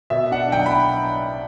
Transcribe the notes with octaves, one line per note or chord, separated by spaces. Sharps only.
B2 E5
D4 F#5
B1 G5
B5